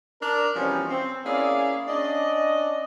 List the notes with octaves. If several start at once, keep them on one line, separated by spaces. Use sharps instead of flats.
D4 A#4
B2 E3 F3 G3 C4 C#4
C4
A#3 C#4 E4 G#4 D5 F5
C#4 D4 D5 D#5